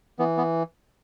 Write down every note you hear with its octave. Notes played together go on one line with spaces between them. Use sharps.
E3 B3
B3